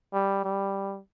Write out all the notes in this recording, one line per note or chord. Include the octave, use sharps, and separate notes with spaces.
G3
G3